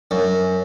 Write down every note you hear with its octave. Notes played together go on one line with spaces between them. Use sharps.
F#2